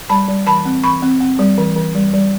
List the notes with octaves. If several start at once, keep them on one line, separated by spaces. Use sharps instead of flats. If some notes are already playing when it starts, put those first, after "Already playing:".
G3 A5 B5
G3
E3 A5 B5
C4
E3 B5 C#6
C4
C4
G3
E3
E3
G3
G3